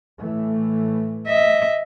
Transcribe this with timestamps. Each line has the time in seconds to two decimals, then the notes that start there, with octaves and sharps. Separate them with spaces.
0.19 A2 E3 A3
1.27 D#5 E5